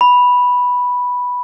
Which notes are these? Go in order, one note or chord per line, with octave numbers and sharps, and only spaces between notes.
B5